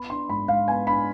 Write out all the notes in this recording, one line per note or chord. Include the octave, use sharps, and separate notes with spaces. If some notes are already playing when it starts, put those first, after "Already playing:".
Already playing: B3 B5
D4 C6
G#2 B5
G#2 F5
B3 G#5
D4 B5